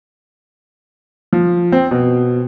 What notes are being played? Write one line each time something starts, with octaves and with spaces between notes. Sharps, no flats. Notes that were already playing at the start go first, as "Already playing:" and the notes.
F3
C4
B2